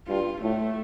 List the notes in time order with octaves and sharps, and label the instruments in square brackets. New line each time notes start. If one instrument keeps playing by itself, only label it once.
[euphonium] G2 [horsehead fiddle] F4
[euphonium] A2 [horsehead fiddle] A3